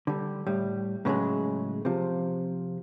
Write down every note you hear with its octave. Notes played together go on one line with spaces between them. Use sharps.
D3 G3
A2 G3
A2 C#3 F3 F#3 G#3
C3 F3